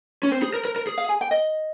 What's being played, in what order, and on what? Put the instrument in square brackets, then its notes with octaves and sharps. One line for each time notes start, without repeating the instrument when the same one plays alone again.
[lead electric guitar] C#4
[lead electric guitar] C4 [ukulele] C5
[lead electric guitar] G#4
A#4
A#4
A#4
G#4
[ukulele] F5
G#5
G5
D#5